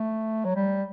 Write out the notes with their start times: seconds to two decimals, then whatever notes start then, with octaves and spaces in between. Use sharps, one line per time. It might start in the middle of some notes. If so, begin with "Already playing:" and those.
Already playing: A3
0.45 F#3
0.55 G3